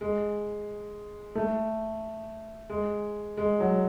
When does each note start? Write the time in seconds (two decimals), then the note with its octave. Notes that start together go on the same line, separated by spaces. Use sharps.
0.01 G#3
1.35 A3
2.70 G#3
3.37 G#3
3.60 F#3